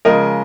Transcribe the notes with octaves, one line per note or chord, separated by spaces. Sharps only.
C#3 F3 G#3 A#4 D#5